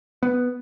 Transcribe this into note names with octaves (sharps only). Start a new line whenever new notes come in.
B3